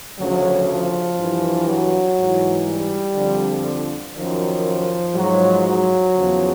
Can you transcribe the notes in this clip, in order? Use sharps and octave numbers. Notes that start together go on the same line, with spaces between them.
D2 C#3 F3 F#3
F3
G2 E3
F#3
G#2 E3
G3
F2 D3 F3
F#2 D#3 F3
G#2 F3 F#3
F#3
E2 C#3 F3